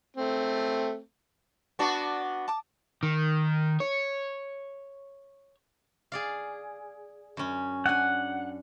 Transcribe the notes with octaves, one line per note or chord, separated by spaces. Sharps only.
A3 C4
B3 D4 F#4 D5 A5 C#6
A5 D6 D#6
D#3
C#5
G#4 D5 F5
F#2 C#4
D4 F#5 G#5